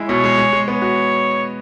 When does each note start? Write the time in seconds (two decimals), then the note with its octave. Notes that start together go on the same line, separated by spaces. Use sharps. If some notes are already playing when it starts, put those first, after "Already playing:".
Already playing: G#3 E4
0.09 B2 C#5
0.24 G#3
0.38 G#3
0.53 G#3
0.67 B3 C#5
0.82 F#4